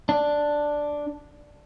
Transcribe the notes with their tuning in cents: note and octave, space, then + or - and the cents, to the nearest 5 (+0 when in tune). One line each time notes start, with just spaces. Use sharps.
D4 +0